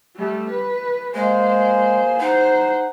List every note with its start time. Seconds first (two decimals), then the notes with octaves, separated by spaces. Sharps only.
0.16 G3 A3
0.50 B4
1.14 G#3 A#3 G#4 C5 G#5
2.20 D#4 C5 F#5